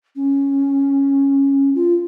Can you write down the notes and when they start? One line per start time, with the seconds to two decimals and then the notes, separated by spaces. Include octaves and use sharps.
0.16 C#4
1.75 F4